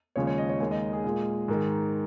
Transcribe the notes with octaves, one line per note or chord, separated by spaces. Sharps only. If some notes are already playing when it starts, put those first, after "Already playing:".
D#2 C#3 F3 G#3 C#5
C#5
D#5
C#5
D#2 D#3 G#3 C#5
D#5
G#4
A#2 G#3
G#2 D#3 G#3